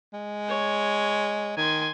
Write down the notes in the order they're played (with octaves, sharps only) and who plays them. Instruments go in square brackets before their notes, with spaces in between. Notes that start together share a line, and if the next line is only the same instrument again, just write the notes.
[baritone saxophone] G#3
[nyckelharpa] C#5
[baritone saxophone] D#3 [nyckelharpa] G#5 C6